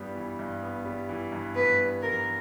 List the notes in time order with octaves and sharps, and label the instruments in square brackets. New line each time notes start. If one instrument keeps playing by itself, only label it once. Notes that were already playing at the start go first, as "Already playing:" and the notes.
Already playing: [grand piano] G2 E3 G3 B3
E3
G2
B3
G3
E3
G2
[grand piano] B3 [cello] B4
[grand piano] G3
[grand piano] E3 [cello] A#4